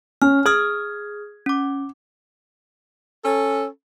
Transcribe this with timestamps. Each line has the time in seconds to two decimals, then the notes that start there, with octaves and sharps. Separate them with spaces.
0.22 C#4 F6
0.46 G#4 D#6 F6 G#6
1.46 C#4 D6
3.25 C#4 A4